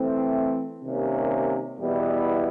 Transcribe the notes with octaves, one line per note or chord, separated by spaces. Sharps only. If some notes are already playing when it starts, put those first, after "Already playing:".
Already playing: E3 A3 C4
C3 D#3 G3 A#3 C#4
E2 B2 G3 B3 E4